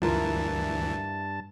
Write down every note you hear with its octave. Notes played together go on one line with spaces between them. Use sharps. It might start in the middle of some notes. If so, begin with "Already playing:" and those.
D2 G2 E3 E4 F4 A#4 A5